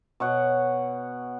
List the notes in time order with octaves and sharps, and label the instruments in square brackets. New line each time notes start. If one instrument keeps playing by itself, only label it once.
[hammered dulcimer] B2 C#5 F#5